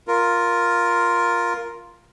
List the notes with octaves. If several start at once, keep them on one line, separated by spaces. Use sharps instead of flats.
F4 A#4